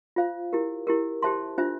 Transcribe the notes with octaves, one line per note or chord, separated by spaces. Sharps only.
F4 C5 F5
E4 G4 A#4
E4 G4 A#4
G4 C5 E5 A5 C6
D4 F4 C5 E5